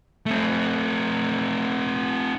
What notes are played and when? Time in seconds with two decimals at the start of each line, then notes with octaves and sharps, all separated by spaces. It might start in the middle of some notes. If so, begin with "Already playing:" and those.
0.26 A3 C4